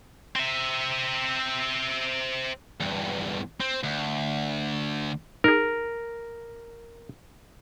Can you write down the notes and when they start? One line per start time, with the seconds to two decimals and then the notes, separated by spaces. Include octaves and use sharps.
0.36 C4 E5
2.80 E2 G2
3.61 C4
3.84 D2
5.44 D#4 G#4 A#4